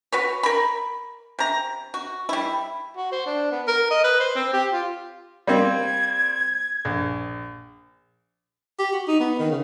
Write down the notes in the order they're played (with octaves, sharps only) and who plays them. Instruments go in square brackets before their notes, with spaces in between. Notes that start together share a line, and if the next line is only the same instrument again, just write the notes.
[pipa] F#4 B4 C#5
A#4 B5
C3 A#5
F#4
G3 E4
[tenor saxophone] F#4
C5
D4
B3
A#4
D#5
B4
C5
C4
G4
F4
[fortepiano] G3 A#3 C4 [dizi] G#6
[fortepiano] A#1
[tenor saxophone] G4
F#4
D#4
B3
D#3
C#3